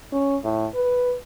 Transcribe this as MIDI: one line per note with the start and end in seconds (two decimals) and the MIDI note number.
0.12 0.36 61
0.44 0.67 45
0.74 1.15 71